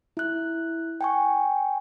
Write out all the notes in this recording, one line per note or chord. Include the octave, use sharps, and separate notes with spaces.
E4 F#6
G5 G#5 C#6